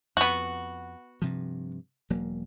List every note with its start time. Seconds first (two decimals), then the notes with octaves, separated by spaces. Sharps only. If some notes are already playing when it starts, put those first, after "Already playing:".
0.17 F2 B3 F#4
1.22 G2 C3 F3
2.10 E1 F#3 A#3